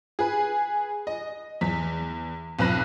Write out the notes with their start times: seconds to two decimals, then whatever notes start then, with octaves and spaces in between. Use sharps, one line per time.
0.19 G#4 B4
1.07 D#5
1.61 E2 B6
2.59 B1 F2 B4 B5 F#6 A#6